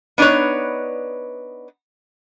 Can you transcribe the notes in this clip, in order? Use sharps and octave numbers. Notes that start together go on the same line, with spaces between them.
B3 D4 D#4 B4 C#5